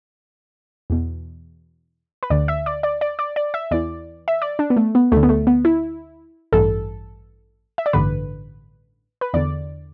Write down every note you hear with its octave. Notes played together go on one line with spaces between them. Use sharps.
E2 B2
B4
D2 D3 D5
E5
D5
D5
D5
D5
D5
E5
E2 E3 D5
E5
D5
D4
B3
A3
B3
D2 D3 A3
B3
A3
B3
E4
A1 G2 E3 A4
E5
D5
A1 G2 D3 B4
B4
E2 D3 D5